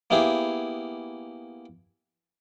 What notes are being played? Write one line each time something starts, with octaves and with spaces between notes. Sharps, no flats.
A#3 B3 E4 G4 G#4